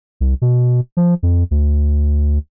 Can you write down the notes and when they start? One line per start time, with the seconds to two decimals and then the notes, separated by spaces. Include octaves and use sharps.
0.21 C2
0.42 B2
0.97 F3
1.23 F2
1.51 D2